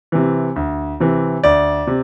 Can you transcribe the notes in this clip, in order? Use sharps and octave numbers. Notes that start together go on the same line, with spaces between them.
C3 E3
D2
C3 E3
D2 D5
C3